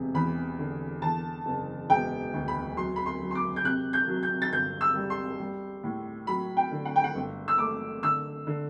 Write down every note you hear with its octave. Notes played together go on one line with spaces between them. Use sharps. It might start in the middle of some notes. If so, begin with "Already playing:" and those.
Already playing: E1 C3
E2 B5
D3
E2 A5
F#1
E1 G5
D2
B5
F#3 C6
B5
C6
F#3
C6
D6
G6
C3 F#6
G6
F#3
G6
A6
G1 G6
E6
G3
C6
G3
A2
F#3 B5
G5
D3
F#5
G5
F#5
G1
E6
A3 D6
D3 E6
D3